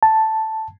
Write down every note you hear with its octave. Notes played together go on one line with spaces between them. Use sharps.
A5